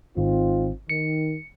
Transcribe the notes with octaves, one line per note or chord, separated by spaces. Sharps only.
G#1 C4 D#4 F4
D#3 C#7